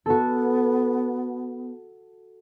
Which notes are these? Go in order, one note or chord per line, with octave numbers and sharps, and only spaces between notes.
B3 F#4 A4